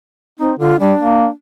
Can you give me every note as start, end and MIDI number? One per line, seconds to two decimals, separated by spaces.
0.40 0.55 60
0.40 0.52 63
0.59 0.74 50
0.59 0.76 65
0.80 0.93 55
0.80 1.27 62
0.99 1.27 58